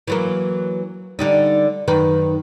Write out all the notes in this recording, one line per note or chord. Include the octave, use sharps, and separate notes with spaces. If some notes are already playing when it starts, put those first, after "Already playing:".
E3 F#3 A#3
D3 G3 D#4
F#2 D#3 B4